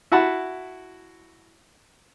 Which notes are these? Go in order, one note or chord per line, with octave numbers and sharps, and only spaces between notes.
E4 F#4 F#5 A5 B5